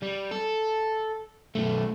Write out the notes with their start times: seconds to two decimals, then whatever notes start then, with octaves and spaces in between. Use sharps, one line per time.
0.03 G3
0.31 A4
1.55 B1 A3